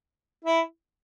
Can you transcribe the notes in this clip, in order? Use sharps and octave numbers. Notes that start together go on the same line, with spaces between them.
E4